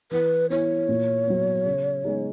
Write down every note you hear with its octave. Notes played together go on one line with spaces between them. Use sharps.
E3 B4
B3 E4 C#5
A#2
F#3 B3
C#3
G#3 B3 D#4 G#4